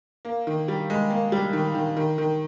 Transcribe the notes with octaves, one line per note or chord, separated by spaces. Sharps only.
A#3
D#3
G3
G#3
A#3
G3
D#3
D#3
D#3
D#3